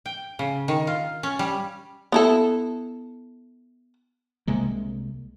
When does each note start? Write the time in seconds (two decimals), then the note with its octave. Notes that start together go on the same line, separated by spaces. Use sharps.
0.06 G5
0.39 C#3
0.68 D#3
0.87 F4
1.23 C#4
1.39 G3
2.12 B3 E4 A4
4.47 C2 C3 G#3 A#3